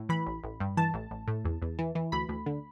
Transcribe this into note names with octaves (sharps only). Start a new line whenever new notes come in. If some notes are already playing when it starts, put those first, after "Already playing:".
Already playing: A2
E3 B5
A1
A1
G2
E3 A5
A1
A1
A2
E2
E2
E3
E3
D2 B5
D2
D3